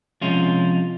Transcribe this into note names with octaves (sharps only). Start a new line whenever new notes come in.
C3 F3 G#3 C#4 F4